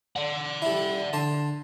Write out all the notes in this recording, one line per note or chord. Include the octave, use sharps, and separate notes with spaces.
D5 F#5
G3 E4
D3 A5 C6